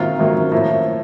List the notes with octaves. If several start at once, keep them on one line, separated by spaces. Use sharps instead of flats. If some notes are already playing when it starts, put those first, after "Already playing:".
Already playing: C3 D#3 F#3 A#3 F4
C3 D#3 F#3 A#3
A2 F3 A#3